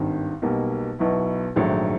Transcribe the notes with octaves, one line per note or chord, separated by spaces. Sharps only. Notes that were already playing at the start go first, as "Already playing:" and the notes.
Already playing: G#1 G2 D#3
B1 B2 G3 A#3
B1 B2 F#3 B3 E4
A#1 G#2 D#3 F#3 A3